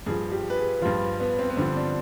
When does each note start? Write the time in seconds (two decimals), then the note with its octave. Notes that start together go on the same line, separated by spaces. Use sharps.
0.06 G2 F3 G#4
0.32 G4
0.50 B4
0.56 G#4
0.82 G2 F3 F4
1.20 B3
1.39 C4
1.50 B3
1.57 G2 D3 F3 C4
1.76 D4